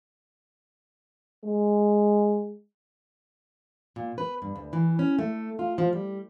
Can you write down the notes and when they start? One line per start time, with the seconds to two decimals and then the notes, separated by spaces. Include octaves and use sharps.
1.44 G#3
3.96 A#2
4.18 B4
4.42 G2
4.56 D2
4.73 E3
4.99 C#4
5.19 A3
5.59 F4
5.78 F3
5.93 G3